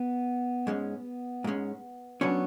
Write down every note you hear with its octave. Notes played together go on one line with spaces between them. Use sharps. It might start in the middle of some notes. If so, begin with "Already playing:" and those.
Already playing: B3
G#2 G#3 C#4
G#2 G#3 C#4
C#3 F#3 B3 C#4 D4 C#5